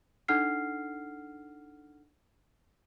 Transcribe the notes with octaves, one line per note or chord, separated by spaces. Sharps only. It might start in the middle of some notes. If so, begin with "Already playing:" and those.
D4 D#4 A4 F#5 F6 C7